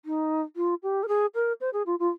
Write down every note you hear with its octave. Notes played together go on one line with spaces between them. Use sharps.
D#4
F4
G4
A#4
G#4
A#4
C5
G#4
F4
F4